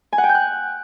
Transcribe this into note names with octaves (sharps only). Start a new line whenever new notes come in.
G#5
F#5
G5
G6
F#6